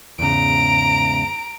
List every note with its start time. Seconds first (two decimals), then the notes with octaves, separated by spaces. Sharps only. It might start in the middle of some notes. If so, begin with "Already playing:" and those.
0.19 E2 G#2 C#3 A#5 D7